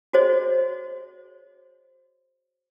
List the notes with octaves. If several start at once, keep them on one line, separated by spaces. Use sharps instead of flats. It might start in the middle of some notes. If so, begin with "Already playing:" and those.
F#4 G#4 C5 C#5 D#5